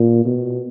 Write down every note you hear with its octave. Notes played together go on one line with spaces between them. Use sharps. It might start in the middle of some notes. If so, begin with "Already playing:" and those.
Already playing: A#2
B2